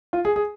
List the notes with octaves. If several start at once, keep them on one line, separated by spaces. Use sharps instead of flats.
F4
G#4
G#4